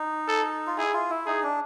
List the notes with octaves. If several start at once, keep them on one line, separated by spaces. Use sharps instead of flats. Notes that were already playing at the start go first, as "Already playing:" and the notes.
Already playing: D#4
A4
F4
E4 G#4
F4
E4
D#4 G#4
D4